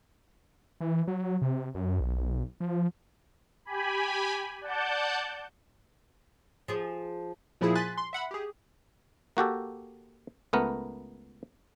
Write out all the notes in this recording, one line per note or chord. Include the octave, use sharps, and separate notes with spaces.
E3
F#3
C3
F#2
B1
F3
G4 G#5 B5
D5 F#5 A5 G6
F3 G#4
A#2 F3 E4 G#4
G#5 C6 F#6 A6 B6
C6
E5 F#5 B5
G4 G#4
A#3 F#4 G4 A4
C#2 A3 B3 A#4